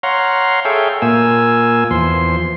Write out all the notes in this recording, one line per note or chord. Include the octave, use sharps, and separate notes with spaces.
C#5 F5 F#5 A#5 C6
G#4 A4 C#5 E5 F5 G5
A#2 A#3 G#5 E6
E2 F3 C6